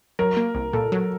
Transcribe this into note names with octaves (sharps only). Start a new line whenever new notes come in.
F#3 A#4
A#3
C2
A#2 A4
F#3